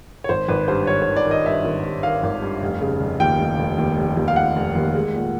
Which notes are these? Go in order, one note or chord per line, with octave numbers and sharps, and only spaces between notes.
C#5
G#1 C5
G#1 B4
G2 C5
G#1 C#5
C#5
D#3
D5
D#3 D#5
G2 E5
G#1
G2
D#3 F5
G#1
G2
F1
C#3
F1
D#2 G5
F1
F1
D#2
F1
D#2
F5
F1 F#5
F1
D#2
G#3
A#2